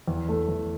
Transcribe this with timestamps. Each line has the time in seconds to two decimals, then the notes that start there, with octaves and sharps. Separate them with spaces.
0.08 E2
0.28 A3
0.48 E2